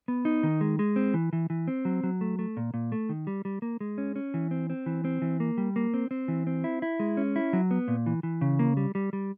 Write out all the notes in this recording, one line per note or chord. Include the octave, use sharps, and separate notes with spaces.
B3
D#4
D#3
G#3
G#3
C4
E3
E3
E3
C4
F#3
F#3
A3
A3
A#2
A#2
A3
D#3
G3
G3
A#3
G#3
C#4
C#4
E3
C4
C4
E3
C4
E3
A#3
G3
A#3
C4
C4
E3
C4
E4
E4
G#3
C#4
E4
F#3
B3
A#2
E3
E3
C#3
A#3
G3
G3
G3